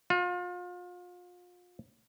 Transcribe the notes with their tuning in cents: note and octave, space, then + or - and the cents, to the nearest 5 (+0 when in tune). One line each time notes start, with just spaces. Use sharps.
F4 +35